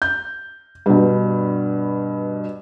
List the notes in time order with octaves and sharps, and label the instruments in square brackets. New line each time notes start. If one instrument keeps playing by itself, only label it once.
[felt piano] G6
G2 B2